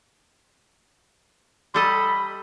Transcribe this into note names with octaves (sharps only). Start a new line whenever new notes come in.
G3 A4 D#5 B5